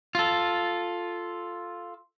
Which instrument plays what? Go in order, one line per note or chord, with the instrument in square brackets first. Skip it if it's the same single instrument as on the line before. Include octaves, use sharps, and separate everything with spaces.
[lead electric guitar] F4 A4